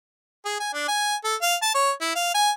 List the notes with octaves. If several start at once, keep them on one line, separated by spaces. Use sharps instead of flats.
G#4
G#5
D4
G#5
A4
F5
A5
C#5
E4
F5
G#5